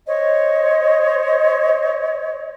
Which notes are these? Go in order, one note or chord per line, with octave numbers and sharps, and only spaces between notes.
C5 C#5 D#5